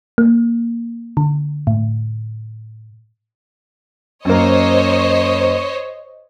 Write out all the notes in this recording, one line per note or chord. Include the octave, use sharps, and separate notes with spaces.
A#3
D3
A2
F#2 A#3 C5 C#5 D#5